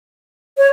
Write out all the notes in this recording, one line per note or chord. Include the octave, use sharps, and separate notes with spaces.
C#5